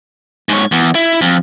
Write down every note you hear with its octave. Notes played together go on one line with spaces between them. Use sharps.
G#2 C#5
E2
E4
F2